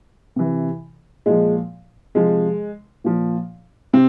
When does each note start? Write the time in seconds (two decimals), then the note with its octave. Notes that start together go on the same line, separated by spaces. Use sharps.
0.36 C3 E3
1.26 A#2 F3 G#3
2.15 C3 F3 G#3
3.04 A#2 F3
3.93 C3 C4